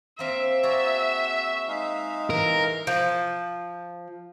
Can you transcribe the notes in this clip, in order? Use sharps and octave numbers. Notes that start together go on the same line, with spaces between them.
A#3 C4 E5 F5
F#4 G#4 D5 A#5 E6
G#3 D#4 F5
E3 A#4
F3